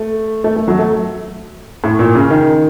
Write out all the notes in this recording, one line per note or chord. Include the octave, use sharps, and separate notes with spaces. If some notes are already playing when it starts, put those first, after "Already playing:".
Already playing: A3
A3
A3
F#3
A3
A2
A#2
C#3
D#3